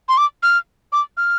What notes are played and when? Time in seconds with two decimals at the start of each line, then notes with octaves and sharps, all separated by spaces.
0.09 C6
0.18 D6
0.43 F6
0.92 D6
1.17 F6